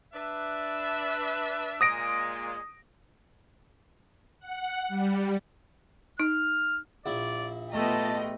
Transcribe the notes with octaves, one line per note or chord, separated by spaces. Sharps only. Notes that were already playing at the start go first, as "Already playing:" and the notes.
D4 B4 E5
A#2 G#3 D#6 A#6 D7
F#5
G3
D#4 F6
A#1 E4 D5
A3 B3 F4 G4 D#5 A5